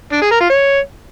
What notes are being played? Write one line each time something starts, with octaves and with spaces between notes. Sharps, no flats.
D4
G#4
A#4
F4
C#5